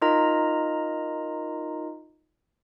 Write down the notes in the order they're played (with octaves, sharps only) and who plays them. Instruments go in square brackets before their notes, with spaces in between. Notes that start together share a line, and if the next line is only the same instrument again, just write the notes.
[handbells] D#4 F4 A#4 D#5 A#5